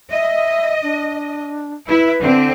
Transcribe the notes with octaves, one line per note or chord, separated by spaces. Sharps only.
D#5 E5
D4
E4 B4
D3 C4